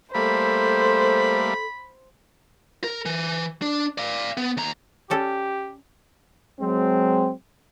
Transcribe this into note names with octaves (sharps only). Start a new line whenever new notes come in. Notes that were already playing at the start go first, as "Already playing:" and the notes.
G3 A3 A#3 A4 C5 B5
A#4
E3
D4
D5 F5
B3
D#2 A#5
G3 C#4 G4 A4
F#3 G#3 C4